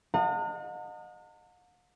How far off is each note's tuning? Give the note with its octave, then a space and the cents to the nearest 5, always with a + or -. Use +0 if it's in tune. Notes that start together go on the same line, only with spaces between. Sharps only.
D#5 -20 F#5 -45 A#5 -45